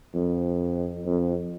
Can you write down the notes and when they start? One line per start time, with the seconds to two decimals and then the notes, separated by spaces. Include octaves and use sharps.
0.15 F2
1.06 F2